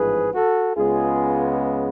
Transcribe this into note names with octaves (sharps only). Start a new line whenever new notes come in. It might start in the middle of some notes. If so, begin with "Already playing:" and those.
Already playing: A1 G#2 F3 G#4 B4
F#4 A4
C#2 C#3 G#3 B3 F4 G#4